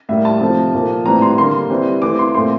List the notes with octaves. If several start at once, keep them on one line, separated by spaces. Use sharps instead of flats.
A2 G3 A#3 E5
A5
C3 F3 A3
A#2 F3 A#3
A2 E3 G3 C4 A#5
C6
D3 G3 A#3 C6
E3 G3 C4
E3 A3 C4 D6
C6
A#2 A3 C4 C6